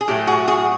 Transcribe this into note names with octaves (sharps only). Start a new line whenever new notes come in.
G#4
A2 F#3 A3 G4
F#4 G#4
F#4 G#4